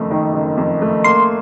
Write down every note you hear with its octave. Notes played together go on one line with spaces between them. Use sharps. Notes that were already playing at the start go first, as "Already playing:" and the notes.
Already playing: F#1 F2 D#3 A3
D#3
F#1
F2
A3
A#3 C6